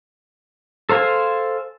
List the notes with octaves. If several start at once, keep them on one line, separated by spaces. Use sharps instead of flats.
A4 C5 F5 G#5